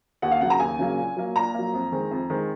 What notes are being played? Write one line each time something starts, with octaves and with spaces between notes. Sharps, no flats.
D#2 F#5
F5
C#3 F#3 A#3 F#5
A#5
D#2 G#5
C#3 F#3 A#3
A#2
F#3 A#3
A#2 A#5
F#3 A#3
F2
D#3 G#3 C4
F2
D#3 G#3 C4